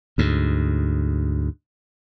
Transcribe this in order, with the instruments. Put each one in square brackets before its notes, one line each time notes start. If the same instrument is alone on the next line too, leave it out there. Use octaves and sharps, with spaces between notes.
[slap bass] D2 G#2